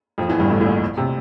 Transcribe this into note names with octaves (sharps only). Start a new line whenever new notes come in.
F2 F3
E2 E3
G1 G2
A1 A2
A2
A#1 A#2
C3